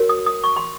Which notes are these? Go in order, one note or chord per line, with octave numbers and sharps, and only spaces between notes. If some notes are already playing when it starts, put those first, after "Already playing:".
Already playing: F#4 A#4 C#5
D#6
D#6
C#6
C6